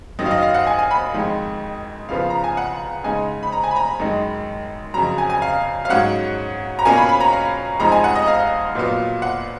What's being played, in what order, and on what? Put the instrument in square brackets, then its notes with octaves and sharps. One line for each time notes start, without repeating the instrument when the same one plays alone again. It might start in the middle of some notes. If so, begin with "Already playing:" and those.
[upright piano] F#2 D#3 F#3 D#5
F5
D#5
F5
F#5
G#5
G#5
B5
F2 D#3 G#3 D#4
C#3 F3 B3 F4 F5
A#5
G#5
F#5
C#3 G#3 D#4 G#5
B5
A#5
G#5
B5
A#5
B5
F#2 D#3 G#3 D#4
F2 C#3 F#3 A#5
G#5
G#5
F5
F5
G#2 F#3 C#4 F#5
A#5
B2 A#3 C#4 F4 G#5
B5
B5
A#5
F5
F2 F3 G#3 D#4 A#5
G#5
F#5
D#5
F5
A#2 F#3 B3 F4
F#5